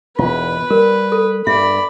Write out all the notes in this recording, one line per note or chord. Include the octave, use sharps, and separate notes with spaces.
E1 E2 G#2 F4 B4
G3 A#4
A4
G2 D5 E5 B5